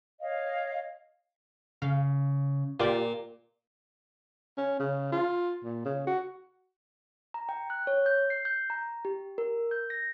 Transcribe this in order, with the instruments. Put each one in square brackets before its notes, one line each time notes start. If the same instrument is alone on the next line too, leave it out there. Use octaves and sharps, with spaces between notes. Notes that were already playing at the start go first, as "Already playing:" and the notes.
[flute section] C#5 D#5 F5
[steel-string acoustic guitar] C#3 [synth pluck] F5
[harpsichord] A#2 [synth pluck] F4 G4 D5
[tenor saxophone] C#4
C#3
F4
A#2
C#3
F#4
[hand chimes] A#5
G5
F#6
C#5
G6
C7
G6
A#5
G4
A#4
G6
A#6